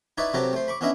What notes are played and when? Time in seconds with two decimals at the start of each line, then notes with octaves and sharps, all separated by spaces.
0.18 D#4 E4 B4 C#5 D5 E5
0.34 C3 F#3 G4 A4 B4 A#5
0.53 A3 C5
0.68 B5 C#6 D6
0.81 B3 C#4 D4 E4 D#5 E5